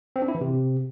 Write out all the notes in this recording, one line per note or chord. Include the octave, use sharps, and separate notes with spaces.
C4
D4
E4
E3
C3